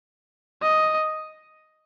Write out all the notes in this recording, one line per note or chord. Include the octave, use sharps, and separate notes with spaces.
D#5